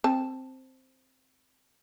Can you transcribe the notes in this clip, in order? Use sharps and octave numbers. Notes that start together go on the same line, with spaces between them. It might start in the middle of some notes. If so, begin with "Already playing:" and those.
C4 A5